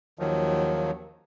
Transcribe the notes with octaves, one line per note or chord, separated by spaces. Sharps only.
D#2 D#3 F3 F#3